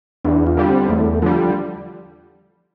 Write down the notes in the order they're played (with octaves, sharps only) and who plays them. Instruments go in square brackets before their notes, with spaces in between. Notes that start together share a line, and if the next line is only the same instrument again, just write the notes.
[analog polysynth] E2 [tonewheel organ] D4
[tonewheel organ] F4
[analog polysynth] D3 G3
[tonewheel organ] C4
[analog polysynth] E2 [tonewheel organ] A3
[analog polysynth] D3 G3 [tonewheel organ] F3